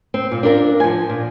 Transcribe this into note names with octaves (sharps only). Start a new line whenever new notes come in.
C4
A#2
D4 F4 A#4 D5
F3 G#5
A#2